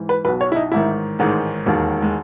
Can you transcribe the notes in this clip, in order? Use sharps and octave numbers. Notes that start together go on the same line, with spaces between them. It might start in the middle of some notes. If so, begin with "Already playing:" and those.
Already playing: G#2 E3
B4
B1 B2 B4
C#5
E4
D#4
A1 G#2 D#3 E4
A1 G#2 D#3 G#3
E1 D#2 D#3
G#3